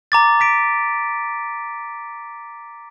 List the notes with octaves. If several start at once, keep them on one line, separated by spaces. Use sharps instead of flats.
A#5 D6 A6
A#5 B6 D7